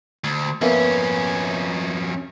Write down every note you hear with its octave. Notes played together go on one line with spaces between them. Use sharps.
D2
F2 A#3 B3 C#4 E5